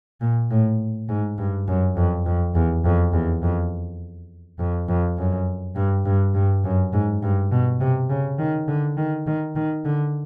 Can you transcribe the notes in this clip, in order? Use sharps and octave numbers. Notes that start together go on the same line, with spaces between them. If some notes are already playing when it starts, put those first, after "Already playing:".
A#2
A2
G#2
G2
F#2
F2
F2
E2
F2
E2
F2
F2
F2
F#2
G2
G2
G2
F#2
G#2
G2
B2
C3
C#3
D#3
D3
D#3
D#3
D#3
D3